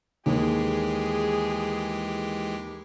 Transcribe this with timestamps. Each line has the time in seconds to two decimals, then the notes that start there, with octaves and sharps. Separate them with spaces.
0.26 D#2 E3 G#3 G4 G#4